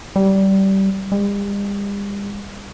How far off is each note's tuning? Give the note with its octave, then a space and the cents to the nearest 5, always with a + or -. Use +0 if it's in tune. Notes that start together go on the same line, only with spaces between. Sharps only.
G3 -20
G3 +45